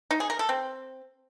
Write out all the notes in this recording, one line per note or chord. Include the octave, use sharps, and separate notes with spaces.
D#4
G#4
A#4
A4
C4